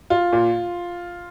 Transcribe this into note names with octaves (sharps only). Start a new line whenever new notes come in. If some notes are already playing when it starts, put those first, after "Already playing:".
F4
A#2